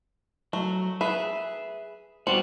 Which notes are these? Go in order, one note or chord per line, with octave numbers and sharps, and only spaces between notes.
F#3 A3
G#4 B4 E5
G3 B3 C4 F#4